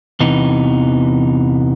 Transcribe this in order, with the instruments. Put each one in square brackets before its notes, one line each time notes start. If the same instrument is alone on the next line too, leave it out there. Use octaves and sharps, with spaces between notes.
[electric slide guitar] E2 C3 E3 B3 D#4